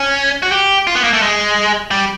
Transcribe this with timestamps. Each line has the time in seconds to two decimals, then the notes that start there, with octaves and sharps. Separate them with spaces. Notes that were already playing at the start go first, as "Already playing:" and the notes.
Already playing: C#4
0.43 F#4
0.52 G4
0.87 F4
0.95 B3
1.04 A#3
1.13 A3
1.22 G#3
1.91 G3